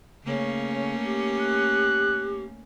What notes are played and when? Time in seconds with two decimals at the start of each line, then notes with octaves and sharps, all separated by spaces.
0.24 C#3 A3 A#3 C#4
1.04 G4
1.41 F#6